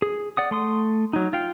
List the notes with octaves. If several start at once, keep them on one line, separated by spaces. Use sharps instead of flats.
G#4
D5 F#5 D#6
A3 C6 D#6
F#3 D#4
F4 F5 G5